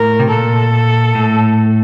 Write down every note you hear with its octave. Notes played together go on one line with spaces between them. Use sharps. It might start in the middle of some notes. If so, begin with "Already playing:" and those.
Already playing: A2 A#4
C3
A#2 A4
A2